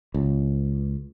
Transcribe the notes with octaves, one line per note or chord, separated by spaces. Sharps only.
C#2